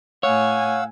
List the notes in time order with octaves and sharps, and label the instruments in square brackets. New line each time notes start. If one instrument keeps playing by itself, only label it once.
[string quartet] A2 G#5 [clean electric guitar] C#5 [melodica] F5 F#5 E6